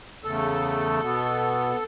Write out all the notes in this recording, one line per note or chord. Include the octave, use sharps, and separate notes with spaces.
E2 C#3 A3 A4
B2 B3